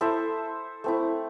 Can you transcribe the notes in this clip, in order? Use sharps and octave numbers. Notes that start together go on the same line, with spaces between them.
E4 A4 C5 E5
A3 C4 E4